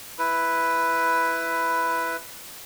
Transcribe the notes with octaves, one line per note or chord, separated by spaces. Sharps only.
E4 B4